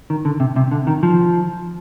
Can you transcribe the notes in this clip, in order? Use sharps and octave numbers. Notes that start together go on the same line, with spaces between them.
D#3
D3
C3
C3
D3
D#3
F3